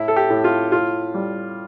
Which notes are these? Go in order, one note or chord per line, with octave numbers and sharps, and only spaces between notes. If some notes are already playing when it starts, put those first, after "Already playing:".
Already playing: A2 E4
A4
G4
A2
F4
A2 F4
G3